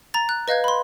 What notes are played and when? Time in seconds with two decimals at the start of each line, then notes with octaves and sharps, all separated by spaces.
0.14 A#5 A6
0.29 F#6
0.48 B4 D#5 F5 G6 G#6
0.64 B5 C6